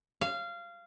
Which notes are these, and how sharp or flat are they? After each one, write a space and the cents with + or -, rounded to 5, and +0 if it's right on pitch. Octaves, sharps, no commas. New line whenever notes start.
F5 -20